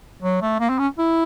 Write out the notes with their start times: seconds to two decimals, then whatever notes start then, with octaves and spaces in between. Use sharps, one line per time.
0.22 F#3
0.41 A3
0.60 A#3
0.70 C4
0.79 C#4
0.98 E4